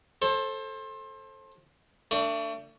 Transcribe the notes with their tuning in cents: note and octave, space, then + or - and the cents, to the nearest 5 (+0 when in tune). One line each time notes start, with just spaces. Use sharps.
A4 +0 C5 +30
A3 +35 D4 +0